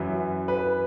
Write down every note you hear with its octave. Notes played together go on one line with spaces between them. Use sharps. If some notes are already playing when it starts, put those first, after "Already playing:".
Already playing: F#2 E3
B4